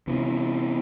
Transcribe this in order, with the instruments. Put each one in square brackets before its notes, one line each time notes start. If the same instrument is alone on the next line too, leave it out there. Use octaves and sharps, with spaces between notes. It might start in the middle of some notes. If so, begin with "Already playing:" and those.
[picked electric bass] C3 E3 B3